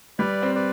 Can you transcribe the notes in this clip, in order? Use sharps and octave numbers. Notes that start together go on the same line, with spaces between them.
G3 B4 D5
C4
B4 D5